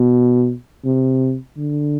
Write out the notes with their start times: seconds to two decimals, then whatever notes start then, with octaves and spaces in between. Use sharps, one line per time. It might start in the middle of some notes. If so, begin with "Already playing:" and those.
Already playing: B2
0.85 C3
1.57 D3